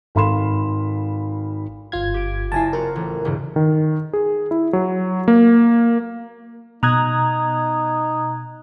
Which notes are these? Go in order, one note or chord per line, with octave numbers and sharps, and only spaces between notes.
G#1 A4 F5 B5 C6 E7
G1 F4 F5 G#6
G4 D7
F#1 E4 G#5 A5 A#6 C7
C4 F4 F#4 A#4
A1
E1 G2 C#3
D#3
G#4
E4
F#3
A#3
B2 D#4 A#5 D#6 F#6 G#6